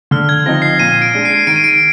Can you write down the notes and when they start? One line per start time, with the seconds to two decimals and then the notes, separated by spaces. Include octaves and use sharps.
0.11 D3 F6
0.29 G#6
0.46 F3 C4 D#4 A#6
0.62 C7
0.79 A#2 D#7
1.02 D7
1.14 G#3 D4
1.25 C7
1.47 D#3 D7
1.56 D#7
1.64 D7